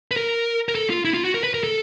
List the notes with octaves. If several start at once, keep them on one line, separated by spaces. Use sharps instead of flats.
B4
A#4
A#4
A4
F4
E4
F4
F#4
A#4
B4
A#4
A4